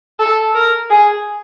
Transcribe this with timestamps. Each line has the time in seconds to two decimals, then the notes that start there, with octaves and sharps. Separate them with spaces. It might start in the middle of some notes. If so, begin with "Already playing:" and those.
0.19 A4
0.55 A#4
0.90 G#4